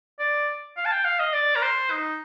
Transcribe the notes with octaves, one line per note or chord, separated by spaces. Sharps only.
D5
F5
A5
G5
F5
D#5
D5
A#4
C5
D#4